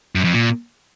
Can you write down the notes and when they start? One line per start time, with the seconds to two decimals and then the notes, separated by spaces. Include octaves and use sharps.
0.15 F#2
0.24 F2
0.34 A#2